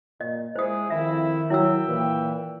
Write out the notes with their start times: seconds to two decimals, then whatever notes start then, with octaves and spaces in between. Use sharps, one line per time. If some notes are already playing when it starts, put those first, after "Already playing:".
0.21 A#2 D#5
0.56 G#3 E4 G#4 C5 D#6
0.90 F2 D#3 E4 E5
1.50 F#3 E4 E5 G5 E6
1.88 A#2 E3